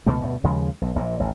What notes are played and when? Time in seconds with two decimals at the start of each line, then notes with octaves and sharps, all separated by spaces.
0.06 C#2 B2 E3 A3
0.20 D2 G2 B2
0.44 D#2 C#3 F3 G#3
0.82 B1
0.96 A#1 A#2
1.20 A1 D#2